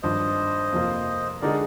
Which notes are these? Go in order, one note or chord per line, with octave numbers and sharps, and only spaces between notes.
G#1 G2 F3 C5 D#5
F2 C3 F3 A#3 F4
D3 G#3 D#4 G#4 A#4 D5